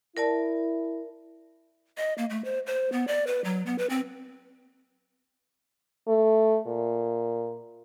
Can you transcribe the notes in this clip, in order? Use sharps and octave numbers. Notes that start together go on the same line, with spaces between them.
E4 A#4 D5 A5
D#5
A#3
A3
C5
C5
B3
D5
B4
F#3
B3
B4
C4
A3
A#2